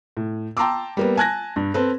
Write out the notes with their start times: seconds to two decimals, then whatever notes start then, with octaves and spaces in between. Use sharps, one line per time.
0.17 A2
0.57 G5 A5 A#5 C6 D6 E6
0.97 G3 A#3 B3
1.17 G#5 A5 F#6 G#6 A#6
1.56 G2
1.74 C4 A4 B4